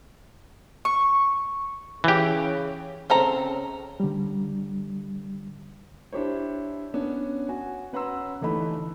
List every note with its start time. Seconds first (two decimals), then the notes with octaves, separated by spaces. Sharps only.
0.85 C#6
2.04 C#3 E3 G4
3.10 C#3 C4 A4 A#5
4.00 D3 G3
6.13 D4 E4 G4 C5 C#5
6.94 B3 C#4 D4
7.49 F#4 G#5
7.93 C#4 B4 F#5 A#5 C6 E6
8.41 G1 E3 A3 D#4 B5